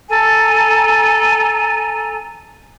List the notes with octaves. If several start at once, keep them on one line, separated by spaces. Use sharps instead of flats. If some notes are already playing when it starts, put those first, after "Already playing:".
A4 G#5 A#5